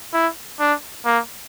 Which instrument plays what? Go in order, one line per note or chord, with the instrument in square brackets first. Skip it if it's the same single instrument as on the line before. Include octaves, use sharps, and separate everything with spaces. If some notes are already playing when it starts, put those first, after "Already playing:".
[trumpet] E4
D4
A#3